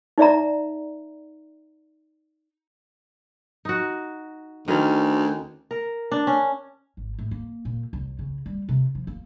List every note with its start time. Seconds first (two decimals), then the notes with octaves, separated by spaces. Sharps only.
0.18 D#4 D5 E5 A#5
3.65 D#4 F#4
4.68 D2 D#3 C#4
5.71 A#4
6.12 D4
6.27 C#4
6.97 G#1
7.18 A2
7.31 A#3
7.65 A#2
7.93 C2
8.19 C#3
8.46 G3
8.69 C3
8.95 F3
9.07 A#3